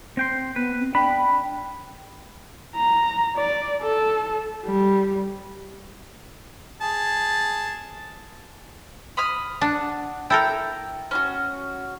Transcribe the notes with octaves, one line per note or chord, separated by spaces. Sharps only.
C4 G5 C6
B3 B4
C4
D4 G5 B5
A#5
D5
A4
G3
G#4 A5
B5 D#6 F6
D4 F#5
E4 A4 A#4 G5
C#4 D#4 F#4